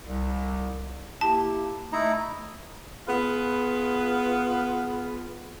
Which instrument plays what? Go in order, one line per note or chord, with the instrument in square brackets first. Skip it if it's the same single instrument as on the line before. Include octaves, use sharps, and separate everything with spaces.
[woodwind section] C2
[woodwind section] A#3 E4 G4 [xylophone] A5
[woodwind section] A3 [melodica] D#4 E4 A#5
[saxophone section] B3 F4 G#4 B4